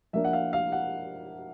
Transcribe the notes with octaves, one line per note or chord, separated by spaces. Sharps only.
F3 A#3 D4 E5
F#5
F5
F5
F#5